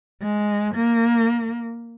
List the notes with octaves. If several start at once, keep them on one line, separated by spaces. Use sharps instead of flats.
G#3
A#3